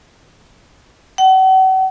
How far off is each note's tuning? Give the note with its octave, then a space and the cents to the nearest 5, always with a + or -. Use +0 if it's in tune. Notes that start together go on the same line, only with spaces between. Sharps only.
F#5 +40